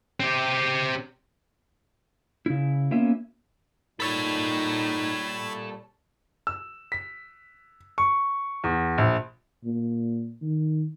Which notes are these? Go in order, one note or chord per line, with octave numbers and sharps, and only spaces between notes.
C4 G4
C#3 E4
A#3 B3 C#4 F4 E5
A#2 G3 D#4 A4 C#5 B5 E6 A6
E6
B6
C#6
E2
A#1
A#2
D#3